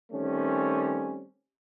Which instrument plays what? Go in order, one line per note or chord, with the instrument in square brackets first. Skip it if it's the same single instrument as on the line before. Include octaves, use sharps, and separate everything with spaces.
[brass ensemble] D#3 G3 A3 C4 C#4